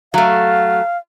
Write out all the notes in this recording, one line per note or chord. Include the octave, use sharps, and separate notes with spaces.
F#3 A3 F5